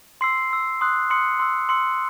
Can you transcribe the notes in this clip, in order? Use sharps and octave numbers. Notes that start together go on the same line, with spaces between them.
C6 E6 C7
C6 E6
C6 D#6 F#6
C6 D#6 F#6 C#7
C6 E6
C6 E6 C#7